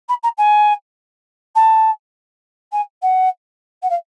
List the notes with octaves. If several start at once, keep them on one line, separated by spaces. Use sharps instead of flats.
B5
A#5
G#5
A5
G#5
F#5
F#5
F5